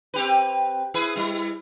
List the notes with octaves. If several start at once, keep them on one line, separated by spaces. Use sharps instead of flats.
C4 G4 B4
E4 G#4 B4
G3 E4